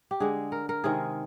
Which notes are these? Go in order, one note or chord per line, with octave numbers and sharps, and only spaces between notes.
G4
D3 G#3 G#4
A#4
A#4
C3 D#3 G#3 G#4